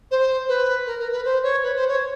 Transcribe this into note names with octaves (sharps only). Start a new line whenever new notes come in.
C5
B4
A#4
A#4
B4
C5
C#5
B4
C5
C#5